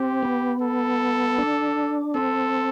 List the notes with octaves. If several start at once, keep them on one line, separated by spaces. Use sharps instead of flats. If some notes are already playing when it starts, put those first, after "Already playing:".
Already playing: C4 G4
B3
A4
D4
C4 A4